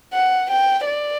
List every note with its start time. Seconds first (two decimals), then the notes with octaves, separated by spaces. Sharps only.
0.13 F#5
0.50 G5
0.86 D5